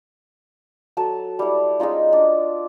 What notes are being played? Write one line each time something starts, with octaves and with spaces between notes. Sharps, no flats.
F#3 A4 A5
G3 E4
G#3 C#4 D#4 F4
D4